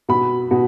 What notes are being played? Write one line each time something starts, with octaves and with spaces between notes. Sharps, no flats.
B2 B5
B2